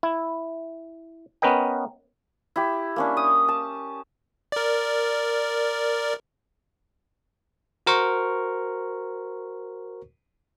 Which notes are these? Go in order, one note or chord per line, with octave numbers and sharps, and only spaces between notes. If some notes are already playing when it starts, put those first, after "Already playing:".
E4
B3 C#4 A#4 B4 D#5 G5
E4 G4
A#3 C#4 D4
D#6
A5
A#4 D5
F#4 A#4 C5 C#6